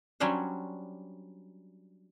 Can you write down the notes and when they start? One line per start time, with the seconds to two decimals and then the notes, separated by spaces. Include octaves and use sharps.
0.20 F#3 G3 C#4 D4 C5